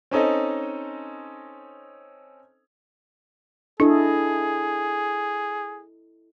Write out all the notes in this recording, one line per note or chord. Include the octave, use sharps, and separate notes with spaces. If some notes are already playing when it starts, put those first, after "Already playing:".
C4 C#4 D#4 A4 D#5
D4 E4 G#4 A4 D#5